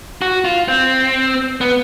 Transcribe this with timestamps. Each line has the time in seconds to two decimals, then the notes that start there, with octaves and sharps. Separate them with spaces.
0.22 F#4
0.45 F4
0.68 C4
1.61 B3